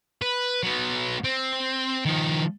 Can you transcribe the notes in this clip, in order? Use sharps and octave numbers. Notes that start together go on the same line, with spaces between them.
B4
F#3 B3
C4
D#3 F3